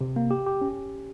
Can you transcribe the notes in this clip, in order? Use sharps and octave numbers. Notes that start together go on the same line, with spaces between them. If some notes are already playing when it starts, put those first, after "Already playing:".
C3
A#3
G4
G4
C#4